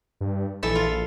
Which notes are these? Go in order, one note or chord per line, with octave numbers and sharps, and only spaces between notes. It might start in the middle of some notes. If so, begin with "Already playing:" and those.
G2
A#1 E3 A4 E5
F4